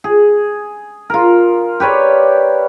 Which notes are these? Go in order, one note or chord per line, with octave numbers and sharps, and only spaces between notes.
G#4
F4 A#4
G4 B4 C#5 D5